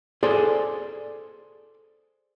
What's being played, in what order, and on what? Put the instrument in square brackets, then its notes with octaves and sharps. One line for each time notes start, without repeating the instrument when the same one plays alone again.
[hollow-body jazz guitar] G#4 A4 C5 D5 G#5